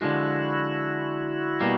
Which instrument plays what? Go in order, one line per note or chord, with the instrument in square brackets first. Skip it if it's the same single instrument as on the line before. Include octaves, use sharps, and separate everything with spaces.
[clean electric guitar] D3 F3 G#3 [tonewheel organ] E4 F#4
[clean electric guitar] B2 G3 A#3